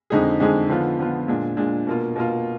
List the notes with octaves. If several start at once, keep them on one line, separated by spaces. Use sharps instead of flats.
F2 D3 G#3 D#4 G#4
F2 D3 G#3 D#4 G#4
D3 F3 B3 F4
D3 F3 B3 F4
A#2 G#3 D4
A#2 G#3 D4
B2 A#3 F4
B2 A#3 F4